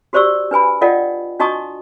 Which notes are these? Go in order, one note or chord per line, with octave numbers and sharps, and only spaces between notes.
F#4 G4 C5 D5 C#6 E6
D4 B4 G#5 B5
F4 A4 D5 D#5 F#5 G5
D4 F#4 D#5 A5 C#6 D#6